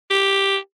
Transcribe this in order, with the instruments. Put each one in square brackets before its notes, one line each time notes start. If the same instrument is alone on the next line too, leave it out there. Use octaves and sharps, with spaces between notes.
[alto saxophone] G4